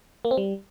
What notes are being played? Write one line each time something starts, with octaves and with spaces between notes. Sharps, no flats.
A#3
C4
G3